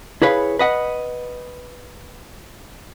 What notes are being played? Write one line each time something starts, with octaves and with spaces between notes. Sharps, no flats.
E4 G#4 B4 C#5 F5
B4 D#5 F#5